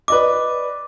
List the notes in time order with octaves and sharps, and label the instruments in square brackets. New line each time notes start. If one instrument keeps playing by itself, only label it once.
[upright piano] B4 D5 D#5 [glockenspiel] D6